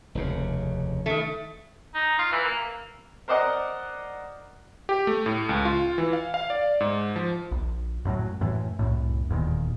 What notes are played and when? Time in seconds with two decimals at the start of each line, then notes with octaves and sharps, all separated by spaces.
0.15 F1 D#2 C#3
1.06 D#3 A3
1.95 D#4
2.19 F4
2.32 E3
2.45 A#3
3.28 A#4 C5 D5 D#5 F#5 A#5
4.89 G4
5.07 A3
5.26 A2
5.49 C#2
5.65 F4
5.98 E3
6.13 F5
6.34 F5
6.50 D5
6.80 G#2
7.16 F3
7.51 A#1
8.05 F#2 A2 F3 F#3
8.41 F#2 A2 E3
8.79 C2 F#2 A2
9.29 D#1 E2 A#2 D#3